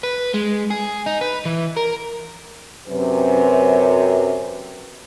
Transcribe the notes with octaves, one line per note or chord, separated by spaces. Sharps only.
B4
G#3
G#4
D#4
B4
E3
A#4
F#2 C3 B4